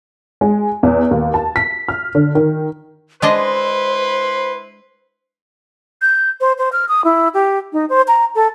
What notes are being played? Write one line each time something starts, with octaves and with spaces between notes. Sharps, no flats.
G#3
E2
D#2
A5
B6
F6
D3
D#3
G#3 D4 E4 B4 C5 D#5 C6
G6
C5
C5
F6
D#6
E4
G4
D#4
C5
A#5
A4